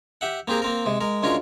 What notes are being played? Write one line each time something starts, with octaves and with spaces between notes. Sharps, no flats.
G4 E5 F#5
A#3 C4 G4 G#4 A#4
A#3 C4 A#4
C3 G#3
G#3 A#4
D2 G#3 C#4 F4 A#4